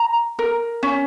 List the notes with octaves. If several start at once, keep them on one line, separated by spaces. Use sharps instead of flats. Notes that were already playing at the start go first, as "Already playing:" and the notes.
Already playing: A#5
A#4
C#4